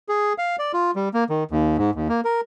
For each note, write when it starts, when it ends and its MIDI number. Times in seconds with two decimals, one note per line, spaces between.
0.09 0.33 68
0.38 0.56 77
0.59 0.72 74
0.74 0.91 65
0.96 1.09 55
1.14 1.24 58
1.30 1.44 51
1.51 1.77 39
1.78 1.91 44
1.95 2.08 39
2.09 2.21 58
2.25 2.41 70